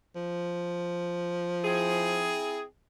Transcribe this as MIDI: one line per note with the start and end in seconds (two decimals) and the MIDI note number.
0.16 2.39 53
1.65 2.63 60
1.65 2.63 64
1.65 2.63 68